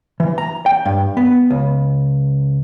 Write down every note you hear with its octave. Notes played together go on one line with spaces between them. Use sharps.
E3
A#5
G5
G2
B3
C#2